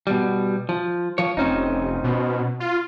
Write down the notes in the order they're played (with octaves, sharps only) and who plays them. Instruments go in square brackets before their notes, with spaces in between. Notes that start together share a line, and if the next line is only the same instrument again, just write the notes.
[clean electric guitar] B2 G3
F3
F3 C#5
[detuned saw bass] F1 [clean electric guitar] C4 C#4 D#4
[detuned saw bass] B2
F4